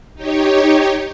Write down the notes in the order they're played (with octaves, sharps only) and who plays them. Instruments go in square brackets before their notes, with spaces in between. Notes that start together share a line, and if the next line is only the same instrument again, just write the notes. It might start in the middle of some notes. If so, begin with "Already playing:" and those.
[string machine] D#4 G4 C#5